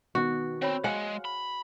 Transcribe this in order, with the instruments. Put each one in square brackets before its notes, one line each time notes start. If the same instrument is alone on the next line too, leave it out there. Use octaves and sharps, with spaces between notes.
[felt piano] B2 D#3 B3 [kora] F#4
[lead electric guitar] C4 [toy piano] C5 C#5 B5
[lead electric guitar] G#3 [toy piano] G#4 G#5 C6 [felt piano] F5 [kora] F#5
[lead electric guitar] B5